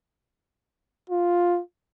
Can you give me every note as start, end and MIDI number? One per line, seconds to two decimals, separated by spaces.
1.10 1.60 65